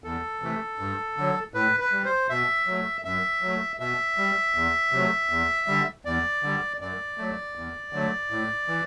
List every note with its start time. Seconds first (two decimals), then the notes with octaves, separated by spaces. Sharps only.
0.04 E2 A4
0.41 C3 E3 A3
0.79 G2
1.17 D3 F#3
1.54 A2 B4
1.80 B4
1.92 G3
2.05 C5
2.29 B2 E5
2.67 F#3 A3
3.05 F#2 E5
3.42 F#3 A3
3.80 B2 E5
4.17 G3
4.55 E2
4.92 C3 F#3 A3
5.30 E2
5.67 D3 G3
6.05 E2 D5
6.43 D3 G3
6.80 F#2 D5
7.18 F#3 A3
7.55 E2
7.93 D3 F#3 A3
8.31 A2
8.68 E3